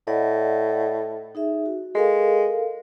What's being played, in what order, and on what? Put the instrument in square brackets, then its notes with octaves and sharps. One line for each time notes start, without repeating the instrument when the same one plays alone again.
[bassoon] A2 [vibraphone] D5 D#5 F#5
[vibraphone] D#4 G#4 E5
F#4
[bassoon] G#3 [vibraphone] A4 A#4 F5